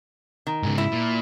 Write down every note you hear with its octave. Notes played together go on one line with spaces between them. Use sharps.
D#3
G#2 C#3
E4
A#2